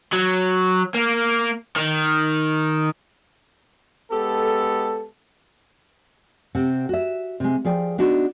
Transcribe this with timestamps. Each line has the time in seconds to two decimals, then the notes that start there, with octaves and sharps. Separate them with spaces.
0.13 F#3
0.95 A#3
1.76 D#3
4.11 G#3 B3 G4 A4
6.55 C3 C4 F#5
6.89 F#4 E5
7.40 C3 G#3
7.65 F3 G#4 D5 G5
7.98 B3 D4 D#4 F#4